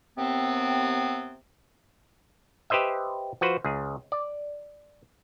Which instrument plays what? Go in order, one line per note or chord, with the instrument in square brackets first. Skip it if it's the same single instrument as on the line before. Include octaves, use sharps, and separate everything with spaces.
[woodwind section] D#2 C3 B3 C4
[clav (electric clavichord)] G4 B4 C5 D#5 E5
F3 F#4 B4 C5
C#2 G#4
D5